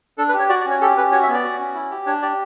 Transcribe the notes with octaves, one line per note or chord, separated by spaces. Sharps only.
D4 A4
B4
G4
C#5
F#4 D5
D5
C#4 C#5
G4 A4
C#4 B4
F#4 C#5
E5
B3
D5
F#4
C#4
E4
G4
D4 C#5
G4 D5